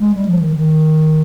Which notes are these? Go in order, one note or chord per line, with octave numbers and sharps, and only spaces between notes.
G#3
G3
F3
D#3
D#3